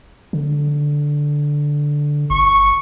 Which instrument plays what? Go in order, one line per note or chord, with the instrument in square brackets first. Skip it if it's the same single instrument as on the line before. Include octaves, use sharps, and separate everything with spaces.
[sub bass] D3
[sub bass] G1 [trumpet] C#6